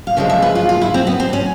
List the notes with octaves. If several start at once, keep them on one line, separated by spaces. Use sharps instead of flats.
F5
C#3 F3 G#3 E5
E5
B4
F4
F4
E4
C4
B3
C4
C#4